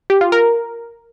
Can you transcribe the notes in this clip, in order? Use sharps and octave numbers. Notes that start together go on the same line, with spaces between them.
G4
F4
A#4